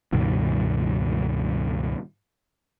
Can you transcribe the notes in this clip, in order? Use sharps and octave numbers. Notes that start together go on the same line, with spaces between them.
C#2 G2 B2 D#3